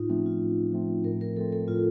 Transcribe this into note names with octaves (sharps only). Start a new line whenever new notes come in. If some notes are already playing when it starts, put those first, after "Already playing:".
Already playing: A2 D#4 F4
F3 A3 C4 C#4
F4
A2
F3 A3 C4
A2 A#4
A#4
F3 A3 C4 A4
A4
A2 F4